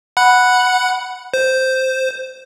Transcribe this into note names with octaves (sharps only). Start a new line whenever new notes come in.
F#5 B5 F#6
C5